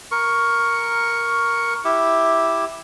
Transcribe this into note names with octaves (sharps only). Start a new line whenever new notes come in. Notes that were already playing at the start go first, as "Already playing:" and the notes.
A#4 C#6
E4 G4